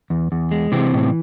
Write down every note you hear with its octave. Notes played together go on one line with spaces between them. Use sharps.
E2
E2
G#3
C3 E3 C4
A2